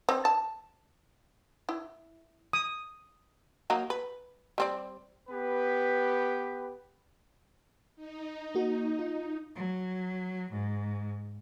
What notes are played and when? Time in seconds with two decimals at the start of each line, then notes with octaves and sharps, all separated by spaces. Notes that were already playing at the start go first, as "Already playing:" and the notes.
0.09 C4
0.25 A5
1.69 E4
2.53 D#6
3.70 F#3 A#3 D#4
3.90 B4
4.58 G3 C4 D5
5.29 B3 G4 B4
7.96 D#4
8.55 A#3 F#4
8.99 F4
9.56 F#3
10.53 G#2